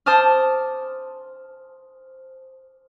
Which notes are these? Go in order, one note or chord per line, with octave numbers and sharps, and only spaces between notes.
C5 A5 D6 D#6 F6